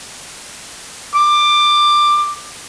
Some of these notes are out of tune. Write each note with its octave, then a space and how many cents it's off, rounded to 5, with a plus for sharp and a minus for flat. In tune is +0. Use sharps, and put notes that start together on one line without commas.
D6 +15